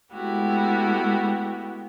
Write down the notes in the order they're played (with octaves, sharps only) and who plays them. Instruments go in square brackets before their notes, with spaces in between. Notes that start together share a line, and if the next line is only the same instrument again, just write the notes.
[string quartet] G#3 A3 B3 E4 F#4 G4